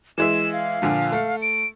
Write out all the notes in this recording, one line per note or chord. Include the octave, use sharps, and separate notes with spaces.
E3 G#3 E5 E7
F5
A#2 D3 F3
A3
D7